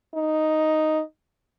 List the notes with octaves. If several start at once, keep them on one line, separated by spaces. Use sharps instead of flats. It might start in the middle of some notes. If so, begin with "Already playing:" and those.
D#4